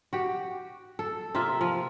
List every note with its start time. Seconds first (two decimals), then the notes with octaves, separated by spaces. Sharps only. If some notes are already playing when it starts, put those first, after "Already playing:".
0.13 F#4 G4
0.99 A4
1.35 C3 A#3 F4 E5
1.61 F3